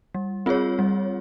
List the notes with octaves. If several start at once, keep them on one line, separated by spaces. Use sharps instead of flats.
G3
C4 F4 G#4 C#5
G3